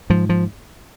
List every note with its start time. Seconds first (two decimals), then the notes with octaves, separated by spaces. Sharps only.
0.10 G#2 F3
0.29 F3